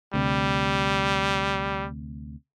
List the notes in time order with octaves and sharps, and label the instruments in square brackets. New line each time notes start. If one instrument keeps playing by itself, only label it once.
[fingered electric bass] D2 C3 [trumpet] G3